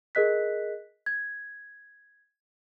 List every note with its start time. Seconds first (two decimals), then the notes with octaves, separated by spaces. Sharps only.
0.15 G#4 A#4 D#5 F#6 B6
1.06 G#6